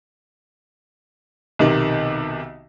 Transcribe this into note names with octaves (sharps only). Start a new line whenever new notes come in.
B1 C3 D#3